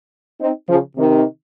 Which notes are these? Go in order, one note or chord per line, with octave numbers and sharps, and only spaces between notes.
C4 D#4
C#3 F3
C3 D#3